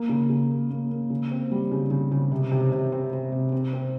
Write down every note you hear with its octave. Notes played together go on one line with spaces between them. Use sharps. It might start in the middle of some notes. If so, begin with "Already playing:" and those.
Already playing: A#3
C#3
C#3
A#3
A#3
A#3
C#3
C4
G3
C#3
C#3
C#3
C3
C3
C3
C4
C4
C3
C4
C4